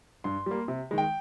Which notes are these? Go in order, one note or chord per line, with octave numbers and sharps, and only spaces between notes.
G2 C6
G3 A#3
C3
D#3 G#3
G5